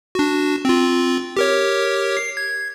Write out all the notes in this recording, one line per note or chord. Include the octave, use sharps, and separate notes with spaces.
D4 F#4
C4 F4
G4 A#4 C#5
C7
G#6